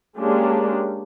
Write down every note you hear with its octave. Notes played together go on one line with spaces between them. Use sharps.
G#3 A#3 C#4 D4 G4